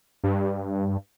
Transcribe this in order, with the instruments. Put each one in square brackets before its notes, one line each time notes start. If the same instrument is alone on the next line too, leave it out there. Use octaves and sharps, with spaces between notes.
[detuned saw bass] G2